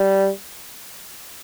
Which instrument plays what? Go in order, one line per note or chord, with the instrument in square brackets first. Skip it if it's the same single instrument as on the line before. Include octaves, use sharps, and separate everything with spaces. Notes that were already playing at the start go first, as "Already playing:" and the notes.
Already playing: [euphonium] G3